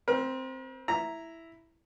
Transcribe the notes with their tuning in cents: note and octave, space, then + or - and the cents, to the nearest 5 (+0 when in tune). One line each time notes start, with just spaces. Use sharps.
C4 +0 A#4 +45
E4 +0 A#5 +0